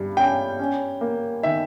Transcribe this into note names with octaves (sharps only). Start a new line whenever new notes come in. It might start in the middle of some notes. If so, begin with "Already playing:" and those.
Already playing: G2 G3
C#4 G5
C#4
A#3
D#3 E5